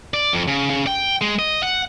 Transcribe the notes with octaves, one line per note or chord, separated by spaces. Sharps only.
D5
F2
C#3
C#3
G5
G#3
D#5
F#5